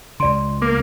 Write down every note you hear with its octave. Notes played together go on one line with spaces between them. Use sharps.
C#2 C#3 D5 C6
A#3 D6